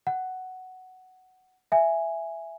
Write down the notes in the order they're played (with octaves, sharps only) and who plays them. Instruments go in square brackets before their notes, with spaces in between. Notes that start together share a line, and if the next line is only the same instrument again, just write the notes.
[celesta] F#5
E5 G#5